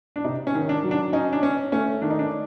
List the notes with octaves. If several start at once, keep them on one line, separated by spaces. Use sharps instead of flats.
D4
C3 D#4
C#4
D#3
D4
F#3
D4
C#4 D#4
D4
C#4
A3 C#4
D#3 D4
D#4
D4